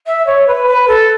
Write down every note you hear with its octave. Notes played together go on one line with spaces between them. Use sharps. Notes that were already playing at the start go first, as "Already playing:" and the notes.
E5
C#5
B4
B4
A4